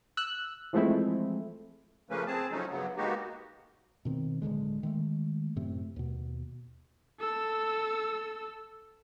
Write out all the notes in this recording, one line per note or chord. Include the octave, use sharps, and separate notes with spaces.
E6 F#6
E3 F3 G#3 A3 C4 E4
C#3 F3 A3 A#3 C#4 B4
C4 G#4 A5
C#3 F3 F#3 A3 C#4 D#4
G2 C#3 F#3 B3
G#3 A#3 B3 D#4 F#4 G4
B2 D#3 C4
D1 C#2 D3 G#3
D#3 G#3 A3
F#2 A2 C3 A3
D#2 B2
A4 E6